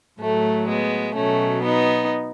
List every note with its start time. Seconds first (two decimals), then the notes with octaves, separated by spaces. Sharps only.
0.20 A2 F#3 A3
0.68 G#3 B3
1.16 B2 F#3 A3 C#4
1.63 B3 D#4